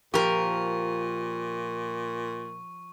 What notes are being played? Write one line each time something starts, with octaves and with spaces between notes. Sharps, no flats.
A#2 F3 G4 A#4 C#6